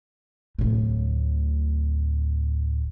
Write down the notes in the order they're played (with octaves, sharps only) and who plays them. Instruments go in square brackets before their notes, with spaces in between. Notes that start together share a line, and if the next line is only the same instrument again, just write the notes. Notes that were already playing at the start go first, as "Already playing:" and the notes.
[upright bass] D1 A2